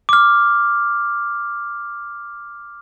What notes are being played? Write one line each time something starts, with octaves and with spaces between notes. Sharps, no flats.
D6 F6